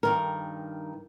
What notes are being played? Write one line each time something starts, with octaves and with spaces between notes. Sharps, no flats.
G2 D#3 A#4